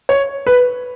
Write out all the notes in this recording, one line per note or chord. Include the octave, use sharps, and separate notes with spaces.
C#5
B4